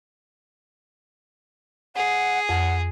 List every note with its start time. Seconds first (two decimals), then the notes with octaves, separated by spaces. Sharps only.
1.96 G#4 F#5
2.49 F2 F#5